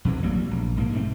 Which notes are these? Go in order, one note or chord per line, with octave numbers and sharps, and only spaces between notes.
F2 C3 E3
A1 F#3 G3 A#3
A#1
B1 G#2 C3 A#3
B1 G#2 A3 C4